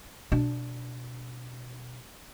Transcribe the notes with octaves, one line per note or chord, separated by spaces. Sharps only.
B2 D4